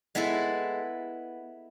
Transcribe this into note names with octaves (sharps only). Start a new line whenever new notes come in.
G#3 B3 E4 A4